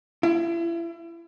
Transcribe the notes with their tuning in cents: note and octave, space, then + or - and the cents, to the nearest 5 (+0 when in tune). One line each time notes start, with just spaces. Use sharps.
E4 +35